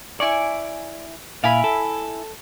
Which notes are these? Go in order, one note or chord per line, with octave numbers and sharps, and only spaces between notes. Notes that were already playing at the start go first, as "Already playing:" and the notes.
E4 D5 G#5 C#6
A#2 E4 F5 G#5 B5
A4